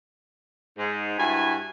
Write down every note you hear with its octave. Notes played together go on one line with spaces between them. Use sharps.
G#2
G2 E4 F#4 G#5